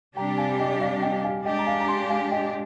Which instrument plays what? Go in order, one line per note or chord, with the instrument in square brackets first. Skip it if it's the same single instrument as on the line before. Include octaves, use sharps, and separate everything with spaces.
[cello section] C3 G3 D4 G4 [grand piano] G5 A#5
[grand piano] F5 G#5
D#5 G5
D5 F5
D#5 G5
F5 G#5
[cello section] G#3 D4 G4 [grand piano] D#5 G5
[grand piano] A#5
F5 G#5
A#5
G#5 C6
F5 G#5
D#5 G5